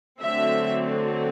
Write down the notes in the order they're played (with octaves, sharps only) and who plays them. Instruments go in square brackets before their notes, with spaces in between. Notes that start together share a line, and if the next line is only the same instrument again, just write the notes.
[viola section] D3 F#3 A3 C4 E5